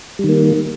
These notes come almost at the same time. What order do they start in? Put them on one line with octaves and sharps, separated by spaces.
G3 D#3 A#3